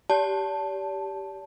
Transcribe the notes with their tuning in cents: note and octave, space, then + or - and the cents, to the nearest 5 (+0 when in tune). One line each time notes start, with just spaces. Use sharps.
G4 -5 D5 -45 A5 +0